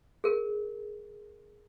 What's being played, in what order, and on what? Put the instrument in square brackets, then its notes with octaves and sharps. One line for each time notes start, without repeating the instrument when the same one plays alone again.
[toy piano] G#4 A#4